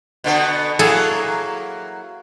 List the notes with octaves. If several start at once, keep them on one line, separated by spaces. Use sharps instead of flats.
B2 D3 B3
F#3 A#3 E4 G#4 A4